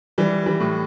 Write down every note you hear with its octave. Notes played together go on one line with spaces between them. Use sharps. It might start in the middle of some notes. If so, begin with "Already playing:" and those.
E3 G3
E3 G3
A2